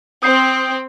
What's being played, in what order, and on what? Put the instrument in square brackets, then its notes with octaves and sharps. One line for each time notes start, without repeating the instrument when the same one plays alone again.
[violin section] C4 [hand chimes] D#6 G6 C7